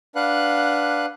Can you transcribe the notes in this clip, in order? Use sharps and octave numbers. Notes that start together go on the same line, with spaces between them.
D4 B4 F5 F#5 F#6